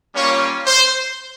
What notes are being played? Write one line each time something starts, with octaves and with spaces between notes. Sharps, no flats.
G3 A#3 C#4 F4 C#5
C5